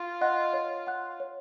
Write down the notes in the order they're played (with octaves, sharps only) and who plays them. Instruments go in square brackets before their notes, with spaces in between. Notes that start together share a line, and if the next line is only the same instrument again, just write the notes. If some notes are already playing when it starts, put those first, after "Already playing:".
Already playing: [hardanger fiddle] F4
[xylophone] D#5 F#5 C6 F#6
C#5
F#5 C6 F#6
C#5